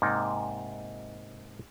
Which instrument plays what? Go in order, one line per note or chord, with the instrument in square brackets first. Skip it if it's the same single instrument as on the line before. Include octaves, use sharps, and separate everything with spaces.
[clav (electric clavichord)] G#2 C3 A#3 D#4 D5